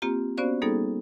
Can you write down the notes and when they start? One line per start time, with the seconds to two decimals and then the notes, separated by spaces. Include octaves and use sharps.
0.02 A#3 C4 F4 G4 A#5
0.37 B3 C#4 F#4 C5 D5 F5
0.62 G3 A#3 B3 D#4 G#4 A4